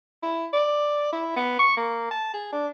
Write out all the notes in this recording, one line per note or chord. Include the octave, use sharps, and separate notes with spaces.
E4
D5
E4
B3
C#6
A#3
A5
G#4
D4